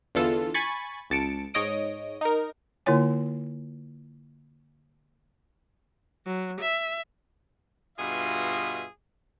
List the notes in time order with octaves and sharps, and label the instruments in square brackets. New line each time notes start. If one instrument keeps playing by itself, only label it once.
[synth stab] E2 D3 E3 F4 A4
G#5 B5 C#6 A6
C#2 A5 C#7 D7
G#2 C#5 D#5 D#6 D7
D#4 A#4
[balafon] D3 A#3 E4 F4 C#5 G#5
[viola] F#3
E5
[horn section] G2 B2 F4 G#4 D#5 E5